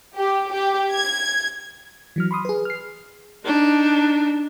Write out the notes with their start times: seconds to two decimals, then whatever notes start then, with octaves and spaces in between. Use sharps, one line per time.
0.18 G4
0.53 G4
0.92 G#6
2.16 E3 F#3 F6
2.31 B5 C6 D#6
2.45 G#4 B4
2.65 F6 C7
3.45 D4 D#4